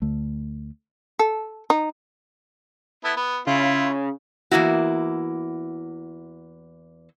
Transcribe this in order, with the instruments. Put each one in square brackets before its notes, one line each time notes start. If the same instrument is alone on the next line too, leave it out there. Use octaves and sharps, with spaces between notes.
[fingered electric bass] D2 A3
[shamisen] A4
D#4
[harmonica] B3 E4 A4
B3
[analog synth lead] C#3 [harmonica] E4 F4
[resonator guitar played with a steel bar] E2 A#2 A#3 E4 F#4